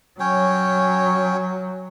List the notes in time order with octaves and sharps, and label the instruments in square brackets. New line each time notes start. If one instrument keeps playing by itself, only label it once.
[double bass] F#3 [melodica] C#4 C#5 G5